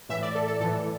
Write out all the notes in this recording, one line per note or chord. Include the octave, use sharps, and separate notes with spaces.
A2 E3 E5
D5
A4
A4
A2 E3 A4